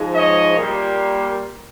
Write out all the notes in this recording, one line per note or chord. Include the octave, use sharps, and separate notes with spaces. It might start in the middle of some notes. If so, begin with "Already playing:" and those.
Already playing: G#2 F3 G#3
C#5 D#5
A#2 G3 A#3